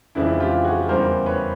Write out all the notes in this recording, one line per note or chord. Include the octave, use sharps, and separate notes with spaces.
F2 C#3 E3 G#3 D4 E4
F4 G4
F#4 G#4
E2 C#3 E3 G3 A#4 C5
B4 C#5